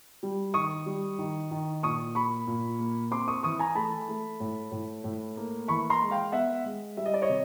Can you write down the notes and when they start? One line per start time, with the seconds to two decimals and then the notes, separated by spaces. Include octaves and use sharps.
0.23 G3
0.54 D#3 C#6 D#6
0.86 G3
1.18 D#3
1.51 D#3
1.83 A#2 C#6 D#6
2.15 A#3 B5 C#6
2.47 A#2
2.79 A#3
3.11 C4 C6 D6
3.28 C#6 D#6
3.43 E3 C#6 D#6
3.59 G#5 A#5
3.75 A3 A5 B5
4.09 A3
4.40 A2
4.72 A2
5.04 A2
5.37 A#3
5.68 E3 B5 C#6
5.90 A#5 C6
6.01 G#3
6.11 F5 G5
6.32 B3 E5 F#5
6.64 G#3
6.97 G3 E5
7.06 D#5
7.14 D5
7.22 C#5 D#5
7.29 C3